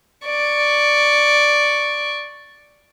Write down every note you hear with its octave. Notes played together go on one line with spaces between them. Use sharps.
D5 C#6